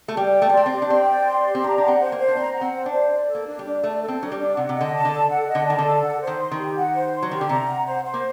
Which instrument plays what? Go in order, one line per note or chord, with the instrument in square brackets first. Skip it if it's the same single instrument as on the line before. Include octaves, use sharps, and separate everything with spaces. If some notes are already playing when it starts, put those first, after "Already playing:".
[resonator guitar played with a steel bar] A3
[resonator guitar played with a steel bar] G3 [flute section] G5
[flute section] D5
[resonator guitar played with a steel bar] A3
G3
[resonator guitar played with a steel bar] A3 [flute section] C6
[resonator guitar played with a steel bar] C4
[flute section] G4
[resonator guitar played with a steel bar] D4
[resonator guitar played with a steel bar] C4 [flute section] G5
[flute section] D5
C6
G4
[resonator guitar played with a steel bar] C4
[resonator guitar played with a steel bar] D4 [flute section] A#5
[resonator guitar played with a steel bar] D4 [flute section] F#5
[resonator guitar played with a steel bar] C4
[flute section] C5
[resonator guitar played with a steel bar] A#3
[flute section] C5
[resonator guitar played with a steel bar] D4
[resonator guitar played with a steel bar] C4 [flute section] A#5
[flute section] F#5
[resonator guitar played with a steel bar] C4
[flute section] C5
[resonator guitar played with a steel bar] D4
[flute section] C5
D5
A4
[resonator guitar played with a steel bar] A#3
[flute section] D4
[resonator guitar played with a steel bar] G3
[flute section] D4
[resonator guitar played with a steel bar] A3 [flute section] D5
[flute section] A4
[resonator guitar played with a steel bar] C4
[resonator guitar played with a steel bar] F#3 [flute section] D4
[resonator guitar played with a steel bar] G3
[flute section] D4
[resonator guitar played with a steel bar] C3 [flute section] F#5
[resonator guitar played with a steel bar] C3
[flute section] D#5
[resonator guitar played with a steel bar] D3
[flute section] A5
[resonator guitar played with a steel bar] D3
[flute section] A4
F#5
D#5
[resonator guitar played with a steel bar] D3
[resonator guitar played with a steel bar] D#3 [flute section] A5
[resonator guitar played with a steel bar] D3
[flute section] A4
F#5
C5
[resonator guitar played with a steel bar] D#3
[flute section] C6
[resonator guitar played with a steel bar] D#3
[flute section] G4
F#5
C5
C6
[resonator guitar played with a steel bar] F#3
[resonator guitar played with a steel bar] D#3 [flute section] G4
[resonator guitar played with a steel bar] D3
[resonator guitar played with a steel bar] C3 [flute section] A#5
[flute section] F#5
C5
C5
[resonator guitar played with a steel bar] A#3